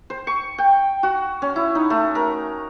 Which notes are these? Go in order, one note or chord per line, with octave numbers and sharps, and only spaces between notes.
C5
C#6
G5
F#4
C#4
E4
D#4
A3
A#4